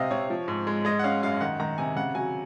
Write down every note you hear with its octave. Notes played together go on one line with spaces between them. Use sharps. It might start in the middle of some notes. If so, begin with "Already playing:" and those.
Already playing: C3 C4 D#5 F5
C3 C#5
F3
G#2
G#3
G#3 D#5
F#5
C#4 F5
F#2 F5
D#3 F#5
D#3 A#5
C3 G#5
C#3 F#5
F#3 G#5